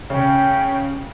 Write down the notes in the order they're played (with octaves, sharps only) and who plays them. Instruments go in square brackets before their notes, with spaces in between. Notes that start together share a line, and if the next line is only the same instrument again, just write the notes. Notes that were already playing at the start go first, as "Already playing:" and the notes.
[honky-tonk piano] C#3 [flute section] C#4 G5